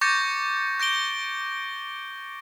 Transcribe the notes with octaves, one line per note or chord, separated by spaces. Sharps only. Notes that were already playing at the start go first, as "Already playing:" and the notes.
C#6 D6 G6 A6 A#6 C#7
G6 A#6 D7 G7